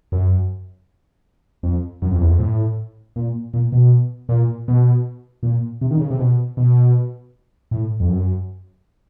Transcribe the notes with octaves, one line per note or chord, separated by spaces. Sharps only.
F#2
F2
F#2
F2
E2
F2
A2
A#2
A#2
B2
A#2
B2
A#2
C3
D#3
C#3
C3
B2
B2
A2
F2
F#2